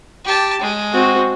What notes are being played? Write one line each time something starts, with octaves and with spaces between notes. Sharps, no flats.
G4 A5
G#3
C4 F#4